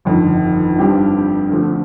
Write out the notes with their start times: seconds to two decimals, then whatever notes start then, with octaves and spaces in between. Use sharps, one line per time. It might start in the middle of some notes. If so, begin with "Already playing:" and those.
0.05 G1 F2 D#3
0.78 G2 F3 C4 G4
1.50 D2 D3 F3 A3